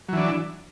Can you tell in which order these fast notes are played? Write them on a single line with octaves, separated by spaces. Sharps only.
F#3 E3 D4